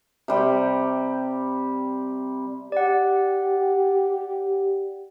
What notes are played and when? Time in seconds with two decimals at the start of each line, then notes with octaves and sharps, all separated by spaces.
0.28 C3 G3 G5
2.72 G4 D5 F#5